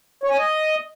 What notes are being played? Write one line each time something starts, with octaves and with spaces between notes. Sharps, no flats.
C#5
G#5
D#5